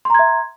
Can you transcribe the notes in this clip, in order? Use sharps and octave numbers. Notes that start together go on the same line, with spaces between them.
E5 A#5 C6 G#6